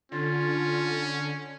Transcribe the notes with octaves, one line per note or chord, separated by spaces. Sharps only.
D3 C#4 F4